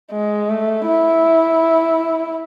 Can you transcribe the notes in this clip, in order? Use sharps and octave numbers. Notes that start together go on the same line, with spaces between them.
G#3
A3
E4